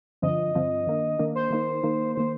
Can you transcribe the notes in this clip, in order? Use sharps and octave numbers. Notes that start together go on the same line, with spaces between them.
G2 D3 F3 C4 D#5
G2 D3 F3 C4
D#3 A#3 D4
D#3 A#3 D4
C5
D#3 A#3 D#4
D#3 A#3 D#4
D#3 A#3 C5